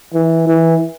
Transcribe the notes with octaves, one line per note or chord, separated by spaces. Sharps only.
E3
E3